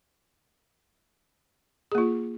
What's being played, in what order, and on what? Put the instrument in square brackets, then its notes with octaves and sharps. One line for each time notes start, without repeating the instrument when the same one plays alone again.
[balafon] G#4
A#3
F4